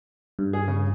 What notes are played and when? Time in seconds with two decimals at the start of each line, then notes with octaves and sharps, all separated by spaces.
0.39 G2
0.53 G#4
0.68 C#3